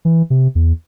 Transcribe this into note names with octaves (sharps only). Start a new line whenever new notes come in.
E3
C3
E2